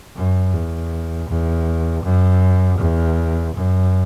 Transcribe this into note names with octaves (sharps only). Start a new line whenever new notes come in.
F#2
E2
E2
F#2
E2
F#2